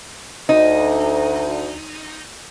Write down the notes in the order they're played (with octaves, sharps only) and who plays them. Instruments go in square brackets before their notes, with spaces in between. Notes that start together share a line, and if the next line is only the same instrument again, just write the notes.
[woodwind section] D2 [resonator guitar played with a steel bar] D#4